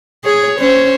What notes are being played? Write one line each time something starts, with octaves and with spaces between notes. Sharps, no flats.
G#4 C#5
C#4 C5 C#5